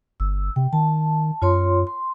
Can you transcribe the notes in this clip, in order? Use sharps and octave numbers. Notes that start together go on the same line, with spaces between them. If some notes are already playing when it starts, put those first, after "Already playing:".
G1 E6
C3 G5
D#3 A5
F#2 F4 C#5 C6
C6